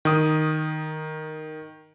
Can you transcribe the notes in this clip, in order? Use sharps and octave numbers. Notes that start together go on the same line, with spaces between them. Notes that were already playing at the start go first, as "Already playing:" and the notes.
D#3 D#6